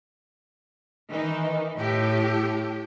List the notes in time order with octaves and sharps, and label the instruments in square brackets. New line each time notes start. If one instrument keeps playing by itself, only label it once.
[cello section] D#3 E3 D#4
[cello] A2 [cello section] G4